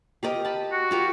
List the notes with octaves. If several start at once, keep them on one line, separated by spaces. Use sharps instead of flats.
G4 A#4 D#5
A5 B5
F#4
F4 G4 A#4